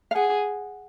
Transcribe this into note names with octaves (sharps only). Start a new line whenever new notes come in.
F5
G#4 F#5